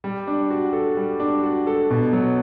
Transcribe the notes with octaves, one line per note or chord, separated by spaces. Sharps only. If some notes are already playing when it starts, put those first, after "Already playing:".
G3
D4
F#4
A4
G3
D4
F#4
A4
B2
F#3